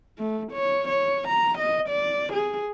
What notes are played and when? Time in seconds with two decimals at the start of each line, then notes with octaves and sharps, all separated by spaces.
0.18 A3
0.52 C#5
0.88 C#5
1.28 A#5
1.58 D#5
1.89 D5
2.33 G#4